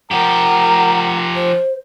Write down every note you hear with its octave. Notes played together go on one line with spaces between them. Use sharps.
F3 G4 A#4 F#5
C5